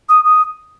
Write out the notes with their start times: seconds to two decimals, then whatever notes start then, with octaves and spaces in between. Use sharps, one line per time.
0.09 D#6
0.25 D#6